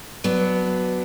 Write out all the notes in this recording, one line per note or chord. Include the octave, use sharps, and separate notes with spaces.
F#3 B3 D4